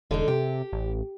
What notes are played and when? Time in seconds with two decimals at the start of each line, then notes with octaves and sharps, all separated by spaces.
0.11 E1 D3 G#3 D#4
0.28 C3 G4
0.73 A1